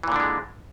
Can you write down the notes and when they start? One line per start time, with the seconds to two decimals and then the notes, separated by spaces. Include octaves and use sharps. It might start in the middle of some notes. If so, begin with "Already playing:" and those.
0.03 E3
0.08 A#2
0.12 D3
0.16 D4
0.20 G#3